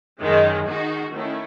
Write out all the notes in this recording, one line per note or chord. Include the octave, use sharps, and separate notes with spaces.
F#2 D#3 G#3
D#3 G#3 D#4 F#4
D#3 A3 C#4 E4